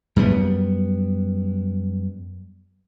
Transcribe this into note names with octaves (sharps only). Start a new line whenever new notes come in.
F#2 G3 B3